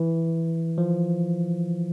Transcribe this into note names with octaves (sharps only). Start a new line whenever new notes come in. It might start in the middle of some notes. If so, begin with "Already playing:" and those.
Already playing: E3
F3